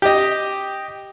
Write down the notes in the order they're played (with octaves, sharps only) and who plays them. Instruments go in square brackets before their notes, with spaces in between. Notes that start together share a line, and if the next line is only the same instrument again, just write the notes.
[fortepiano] G4 D#5